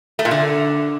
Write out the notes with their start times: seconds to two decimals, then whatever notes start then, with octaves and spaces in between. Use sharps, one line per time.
0.19 A3
0.25 A#2
0.31 D3